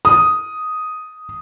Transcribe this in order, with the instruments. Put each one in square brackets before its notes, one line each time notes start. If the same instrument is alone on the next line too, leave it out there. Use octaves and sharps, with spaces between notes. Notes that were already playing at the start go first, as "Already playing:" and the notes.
[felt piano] D#6